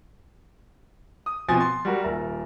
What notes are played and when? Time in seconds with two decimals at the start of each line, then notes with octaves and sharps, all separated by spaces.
1.26 D#6
1.48 B2 F3 C4 G#5 D#6 A6
1.60 C6
1.85 G3 F#4 A#4
2.03 D#1 A#4 E5